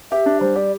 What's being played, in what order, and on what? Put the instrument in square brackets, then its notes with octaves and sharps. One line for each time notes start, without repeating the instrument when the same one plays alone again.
[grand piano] G4 [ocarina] E5
[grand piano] D4
[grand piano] G3 [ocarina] C5
[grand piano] G4 [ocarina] D5